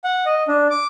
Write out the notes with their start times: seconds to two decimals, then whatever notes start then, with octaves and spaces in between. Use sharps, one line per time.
0.04 F#5
0.26 D#5
0.48 D4
0.70 D6